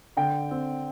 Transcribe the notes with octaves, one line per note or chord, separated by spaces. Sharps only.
D3 G5
C4